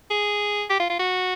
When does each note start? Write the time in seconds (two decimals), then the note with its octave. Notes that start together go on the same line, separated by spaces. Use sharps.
0.10 G#4
0.70 G4
0.80 F4
0.90 F4
0.99 F#4